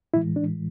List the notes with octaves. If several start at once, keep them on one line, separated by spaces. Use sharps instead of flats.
A2 E3 G#3 E4
D4